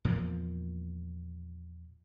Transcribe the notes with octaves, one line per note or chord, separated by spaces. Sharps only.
E2 A#2 F3 A#3